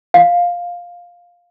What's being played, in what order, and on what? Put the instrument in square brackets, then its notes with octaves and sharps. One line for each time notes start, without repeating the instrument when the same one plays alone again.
[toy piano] F5